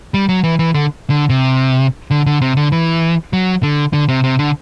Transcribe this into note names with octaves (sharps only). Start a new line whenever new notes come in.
G3
F#3
E3
E3
D3
D3
C3
D3
D3
C3
D3
E3
F#3
D3
D3
C3
C3
D3